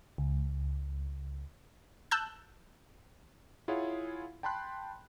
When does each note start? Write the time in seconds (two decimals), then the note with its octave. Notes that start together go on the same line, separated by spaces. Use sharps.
0.18 C#2
2.11 A5 E6 F#6 G6
3.68 E4 F4 G#4 C#5 F5 F#5
4.43 G5 A5 B5 C6 F#6